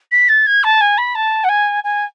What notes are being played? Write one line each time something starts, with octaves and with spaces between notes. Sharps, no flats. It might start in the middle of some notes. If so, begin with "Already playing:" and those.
B6
A6
G#6
A5
G#5
B5
A5
F#5
G#5
G#5